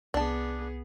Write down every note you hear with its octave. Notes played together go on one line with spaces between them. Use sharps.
C2 B3 D4 G#4 A5